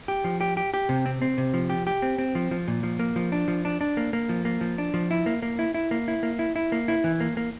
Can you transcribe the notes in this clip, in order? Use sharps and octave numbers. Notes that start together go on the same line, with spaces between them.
G4
F3
G4
G4
G4
C3
C4
C4
C3
F3
G4
G4
C4
C4
F3
F3
A#2
F3
A#3
F3
D4
F3
D4
D4
A#3
A#3
F3
A#3
F3
D4
F3
E4
A#3
A#3
E4
E4
A#3
E4
A#3
E4
E4
A#3
E4
E3
A#3
A#3